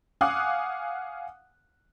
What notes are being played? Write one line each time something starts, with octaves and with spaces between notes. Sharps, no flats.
F5 F#5 G#5 D6 D#6 F#6